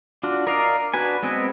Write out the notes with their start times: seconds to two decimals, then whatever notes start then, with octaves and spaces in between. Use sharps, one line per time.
0.23 D4 F4 F#4
0.47 A#4 D5 D#5 F5
0.94 D4 F#4 B4 G#5
1.23 G#3 B3 C4 D#5